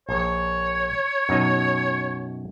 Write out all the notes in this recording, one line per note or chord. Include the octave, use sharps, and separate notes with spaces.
A#1 C#5
F#2 B2 D#4